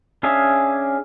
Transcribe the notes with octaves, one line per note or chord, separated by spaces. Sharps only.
C#4 D4 G#4 E5 F5